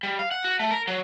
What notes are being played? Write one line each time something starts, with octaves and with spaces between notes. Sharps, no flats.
G3
F5
F#5
F#4
A3
A#4
F#3